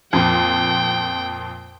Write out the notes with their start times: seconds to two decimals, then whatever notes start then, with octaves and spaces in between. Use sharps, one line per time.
0.13 F2 A#2 G5